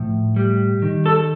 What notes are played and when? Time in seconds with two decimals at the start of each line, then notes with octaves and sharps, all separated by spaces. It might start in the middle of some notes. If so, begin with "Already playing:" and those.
Already playing: A2 F3
0.36 G3
0.82 D#3
1.06 A4